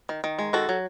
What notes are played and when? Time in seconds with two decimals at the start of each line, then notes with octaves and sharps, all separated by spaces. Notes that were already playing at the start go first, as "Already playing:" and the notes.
0.09 D#3
0.24 D#3
0.39 G#3
0.53 D#3 F#4 A4
0.69 F#3